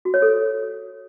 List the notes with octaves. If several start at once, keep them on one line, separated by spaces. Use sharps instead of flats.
F#4
C#5
A4